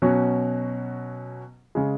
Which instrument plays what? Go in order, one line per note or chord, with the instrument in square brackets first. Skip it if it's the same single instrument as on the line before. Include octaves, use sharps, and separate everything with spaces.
[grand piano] B2 F#3 C#4
C#3 G#3